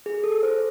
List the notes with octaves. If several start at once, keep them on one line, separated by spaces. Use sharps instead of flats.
G#4
A4
C5